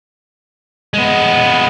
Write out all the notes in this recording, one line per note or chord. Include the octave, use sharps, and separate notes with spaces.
G#3 B3